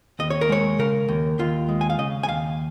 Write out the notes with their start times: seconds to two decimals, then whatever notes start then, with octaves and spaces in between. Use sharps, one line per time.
0.19 D#2 D#5
0.30 C#5
0.41 A#4
0.49 G#3 C#5
0.79 C#3 A#4
1.08 D#2
1.39 D#2 F4
1.69 G#3
1.81 G#5
1.90 F5
1.98 C#3 D#5
2.23 G#5
2.28 D#2 F5